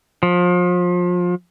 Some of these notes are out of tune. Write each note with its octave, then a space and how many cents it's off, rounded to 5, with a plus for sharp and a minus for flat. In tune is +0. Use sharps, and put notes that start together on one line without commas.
F3 +30